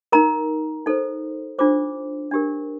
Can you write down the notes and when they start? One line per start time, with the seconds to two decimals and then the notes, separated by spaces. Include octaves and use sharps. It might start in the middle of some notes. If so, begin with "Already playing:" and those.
0.12 D#4 A#4 A#5
0.86 D#4 A4 C5
1.59 D4 F4 A4 C5 D6
2.31 D4 G4 A#4